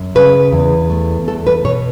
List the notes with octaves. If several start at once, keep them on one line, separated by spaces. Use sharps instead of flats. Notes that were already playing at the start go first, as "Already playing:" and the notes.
Already playing: F#2
C#3 B4
E2
A3
E2 A4
B4
B2 C#5